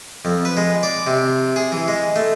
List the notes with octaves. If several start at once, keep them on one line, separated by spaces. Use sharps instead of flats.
F2
B4
G#3
D5
C3
G#4
E3
G#3
A3